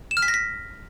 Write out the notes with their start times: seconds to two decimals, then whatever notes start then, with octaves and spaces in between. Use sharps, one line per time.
0.11 E7
0.17 F6
0.22 B6
0.28 A#6
0.34 B6